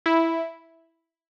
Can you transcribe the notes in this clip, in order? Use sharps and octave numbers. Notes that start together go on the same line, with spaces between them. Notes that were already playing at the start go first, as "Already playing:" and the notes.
E4